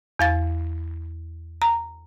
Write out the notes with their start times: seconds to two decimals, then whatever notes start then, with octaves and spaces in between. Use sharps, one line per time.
0.19 E2 F5 A6
1.62 A#5